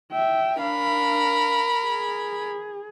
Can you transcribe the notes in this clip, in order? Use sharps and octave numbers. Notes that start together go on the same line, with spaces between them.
E5 G5
D4 A#4 F5 B5
G#4